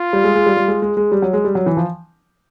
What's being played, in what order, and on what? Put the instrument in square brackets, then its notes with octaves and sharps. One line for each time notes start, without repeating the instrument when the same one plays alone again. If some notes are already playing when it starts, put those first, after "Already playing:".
Already playing: [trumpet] F4
[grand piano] G3
G#3
G#3
G3
G3
G#3
G#3
G#3
G3
F#3
G#3
G3
F#3
E3
F3